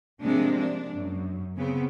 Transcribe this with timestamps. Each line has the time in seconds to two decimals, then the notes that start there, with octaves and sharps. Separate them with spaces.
0.23 C3 F3 G#3 A#3 D4
0.59 D4
0.94 F#2
1.57 C#3 B3 C4